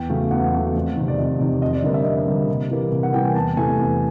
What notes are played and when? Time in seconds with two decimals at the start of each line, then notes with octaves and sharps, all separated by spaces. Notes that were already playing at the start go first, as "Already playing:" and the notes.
Already playing: E2 G5
0.09 C#3 F#3 A3
0.31 E2 F#5
0.53 C#3 F#3 A3
0.75 F2
0.97 C3 D#3
1.08 D5
1.18 F2 D#5
1.39 C3 D#3
1.62 F2 D#5
1.73 D5
1.83 D3 G3 A#3 D#5
1.94 E5
2.05 F2 D#5
2.27 D3 G3 A#3
2.48 C3
2.71 E3 G3 A#3
2.92 C3
3.03 F#5
3.14 E3 G3 A#3 G5
3.24 G#5
3.35 E2 A5
3.57 C3 E3 A3 G#5
3.79 E2